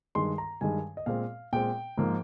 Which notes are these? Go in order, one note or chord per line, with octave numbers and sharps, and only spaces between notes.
G2 D#3 G#3 C6
A#5
G2 D#3 G#3 G#5
D#5
A#2 G#3 C4 F5
A#2 G#3 C4 G5
G#2 F3 A#3